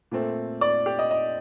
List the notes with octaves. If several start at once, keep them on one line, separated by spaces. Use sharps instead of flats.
A#2 A3 C4
D5
G4
D#5
D#5